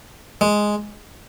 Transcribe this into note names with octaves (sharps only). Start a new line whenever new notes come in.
G#3